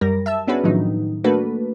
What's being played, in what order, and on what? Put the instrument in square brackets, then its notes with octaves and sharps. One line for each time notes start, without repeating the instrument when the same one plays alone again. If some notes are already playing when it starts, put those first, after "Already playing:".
[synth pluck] F#2 G3 A#4 A#6
E5 A5 E6
B3 C#4 D4 F#4 G#4 B4
A2 D#3 F3 F#3 D#4
A3 A#3 D4 F#4 A4 B4